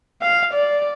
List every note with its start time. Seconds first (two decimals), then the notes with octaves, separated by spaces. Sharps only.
0.22 F5
0.54 D5